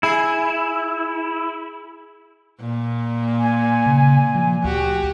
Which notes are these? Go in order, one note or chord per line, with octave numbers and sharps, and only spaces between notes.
E4 G#4
A#2
G#5
C#3
F3
D2 F#4 G4